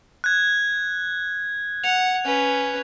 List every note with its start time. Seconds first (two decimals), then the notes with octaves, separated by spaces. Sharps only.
0.24 F#6 G#6
1.84 F#5 F7
2.25 C#4 B4